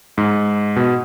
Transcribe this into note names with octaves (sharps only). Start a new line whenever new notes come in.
G#2
B2